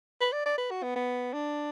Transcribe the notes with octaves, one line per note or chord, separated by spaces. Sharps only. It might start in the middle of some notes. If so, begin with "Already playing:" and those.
B4
D5
D5
B4
F#4
B3
B3
D4